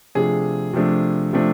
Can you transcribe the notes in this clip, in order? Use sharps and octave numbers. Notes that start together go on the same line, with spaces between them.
C3 F3 A3 D4 G#4
C3 F3 A3 D4
C3 F3 A3 D4